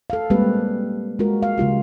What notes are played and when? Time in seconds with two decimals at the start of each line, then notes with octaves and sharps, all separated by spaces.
0.10 A4 F5
0.30 G3 G#3 A#3 C4 G4 B4
1.19 G#3 F4 F#4 A#4
1.43 F5
1.58 C#3 G#3 F4 G4